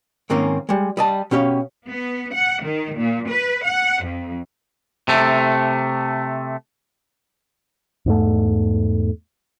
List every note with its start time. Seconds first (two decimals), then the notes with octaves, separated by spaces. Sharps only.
0.30 G#2 D#3 A#3 C4 C#4
0.69 G3 G#3
0.97 G3 D#5 A5
1.31 B2 C#4 G4 F5
1.88 B3
2.35 F#5
2.64 D#3
2.97 A#2
3.30 B4
3.65 F#5
4.05 F2
5.08 C3 A3
8.06 E2 G#2 A3